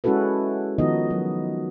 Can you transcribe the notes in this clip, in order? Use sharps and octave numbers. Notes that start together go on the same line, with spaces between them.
G#3 C#4 E4 F#4 A4 B4
D#3 F3 B3 D#4 F#4 D#5
F#3